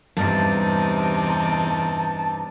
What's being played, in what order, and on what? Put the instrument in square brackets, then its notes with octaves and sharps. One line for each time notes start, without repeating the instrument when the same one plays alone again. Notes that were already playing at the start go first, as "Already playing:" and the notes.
[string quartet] E2 C3 D#4 [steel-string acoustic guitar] G2 [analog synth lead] A5